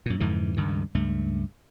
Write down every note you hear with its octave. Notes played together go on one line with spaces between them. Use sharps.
F#2 A#2
F2 G#2 D3 E3
C#2 G2 D#3
C#2 G2 A3